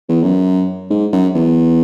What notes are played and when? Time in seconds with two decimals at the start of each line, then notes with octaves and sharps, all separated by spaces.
0.09 E2
0.23 F#2
0.90 G#2
1.13 F#2
1.35 E2